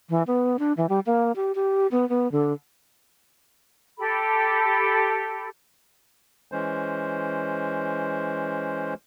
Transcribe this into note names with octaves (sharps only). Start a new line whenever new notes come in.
E3
B3
D4
E3
G3
A#3
G4
G4
B3
B3
D3
G4 A4 B5
E3 G#3 C#4 C5